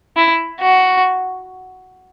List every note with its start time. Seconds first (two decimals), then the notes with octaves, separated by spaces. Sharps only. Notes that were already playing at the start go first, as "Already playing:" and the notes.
0.17 E4
0.60 F#4